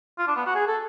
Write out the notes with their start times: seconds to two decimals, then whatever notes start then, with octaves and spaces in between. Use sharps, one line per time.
0.18 F4
0.28 D4
0.36 B3
0.46 F#4
0.55 G#4
0.68 A4